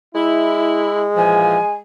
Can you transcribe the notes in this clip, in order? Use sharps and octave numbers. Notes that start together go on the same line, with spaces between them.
G#3 E4
A#2 E3 F3 G#5